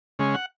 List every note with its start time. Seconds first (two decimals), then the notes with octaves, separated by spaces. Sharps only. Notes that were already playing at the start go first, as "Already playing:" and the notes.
0.19 C#3 G#3 C#4
0.34 F#5